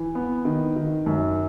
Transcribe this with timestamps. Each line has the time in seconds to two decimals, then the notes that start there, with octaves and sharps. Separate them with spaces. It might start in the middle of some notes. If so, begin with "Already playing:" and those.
Already playing: E3
0.15 B3
0.45 D#3
0.76 D#3
1.06 F#2